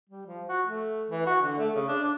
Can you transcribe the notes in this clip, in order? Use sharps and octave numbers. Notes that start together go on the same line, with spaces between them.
G3
F3
F#4
A3
E3
F#4
D3
A3
C#3
D4
D4